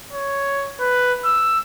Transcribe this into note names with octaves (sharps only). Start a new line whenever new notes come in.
C#5
B4
E6